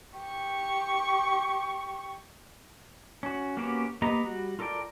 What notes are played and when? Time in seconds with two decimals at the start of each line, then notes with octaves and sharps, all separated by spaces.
0.19 G4 C#6
3.23 C#4 F#4
3.57 A#3 B3 C#4 F#4 G4
4.02 A#3 B3 G4 D#5 A#5
4.24 G3 F#4
4.59 F4 A4 A#4 D5 G5